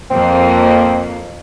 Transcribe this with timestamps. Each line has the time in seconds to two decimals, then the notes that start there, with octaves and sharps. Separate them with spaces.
0.11 F2 A#3 C4